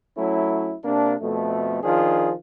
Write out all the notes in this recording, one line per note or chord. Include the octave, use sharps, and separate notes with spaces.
F#3 A3 C#4 E4
C3 A#3 D4
F2 B2 A3
D#3 F3 D4 F4 G#4